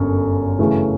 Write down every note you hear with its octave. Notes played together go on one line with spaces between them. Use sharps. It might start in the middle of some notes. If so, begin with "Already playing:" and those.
Already playing: G1 F#2 D3 A#3
F#2 C#3 E3 A3